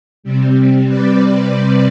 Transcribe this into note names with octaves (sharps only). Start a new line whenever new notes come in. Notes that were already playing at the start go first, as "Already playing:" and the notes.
C3 G3 C4
B4 D5